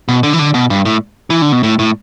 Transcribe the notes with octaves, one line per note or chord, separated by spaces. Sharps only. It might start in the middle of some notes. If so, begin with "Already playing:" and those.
B2
D3
E3
D3
B2
G2
A2
E3
D3
B2
A2
A2